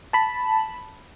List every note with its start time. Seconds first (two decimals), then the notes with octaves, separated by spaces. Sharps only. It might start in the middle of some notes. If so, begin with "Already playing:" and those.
0.13 A5 B5